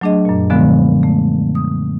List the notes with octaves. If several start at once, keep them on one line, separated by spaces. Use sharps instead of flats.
F#3 A3 D4 G#4 D#5
F#2 A#2
A#2 D3 F3 G#3 B3
A3
D#6